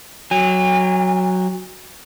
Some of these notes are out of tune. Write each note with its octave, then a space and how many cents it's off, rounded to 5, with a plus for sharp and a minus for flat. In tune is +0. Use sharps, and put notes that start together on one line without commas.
F#3 +0 G#5 -40